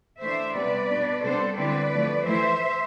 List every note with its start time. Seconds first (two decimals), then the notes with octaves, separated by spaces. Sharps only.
0.21 E3 A3 D4 C5 E5
0.54 C3 G3 B3 B4 D5
0.89 B2 B3 D4
1.23 C3 G3 B3 D4 A4 C5
1.57 D3 G3 C4 E4 B4 D5
1.92 D3 F3 A3
2.26 E3 A3 E4 C5 E5